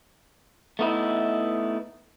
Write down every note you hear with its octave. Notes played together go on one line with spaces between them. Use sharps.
A3 B3 D#4 E4